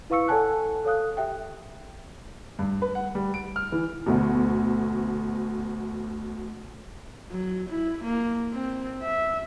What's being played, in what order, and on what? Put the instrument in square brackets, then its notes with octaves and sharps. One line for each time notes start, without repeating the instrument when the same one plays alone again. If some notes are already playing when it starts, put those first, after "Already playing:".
[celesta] E4 B4 F5 C#6 E6 C#7
A4 C#5 F#5 G#5 A5 F#6
A4 C#5 F5 D#6 F#6
G4 E5 G5
[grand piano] G2
B4
F#5
G3
D7
F6
E3
[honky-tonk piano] D2 B2
[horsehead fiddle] F#3
E4
A#3
C4
E5